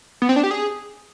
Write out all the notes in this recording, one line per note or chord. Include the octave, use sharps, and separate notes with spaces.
B3
C4
D4
G4
G#4